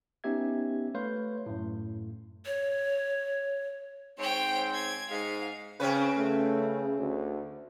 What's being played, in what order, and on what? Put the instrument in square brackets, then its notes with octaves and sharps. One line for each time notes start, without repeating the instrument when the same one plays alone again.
[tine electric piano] B3 C#4 D#4 G4 E5 G#6
A3 B4 C#5 F5 C6 G6
F#2 A2
[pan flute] C#5
[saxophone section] G#2 C4 [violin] C#5 G5
[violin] G#6
[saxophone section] G#2 [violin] F5
[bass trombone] C#3 [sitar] C4 C#4 B4
[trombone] C#3 [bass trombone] A3
[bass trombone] D2